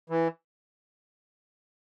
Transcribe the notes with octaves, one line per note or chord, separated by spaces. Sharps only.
E3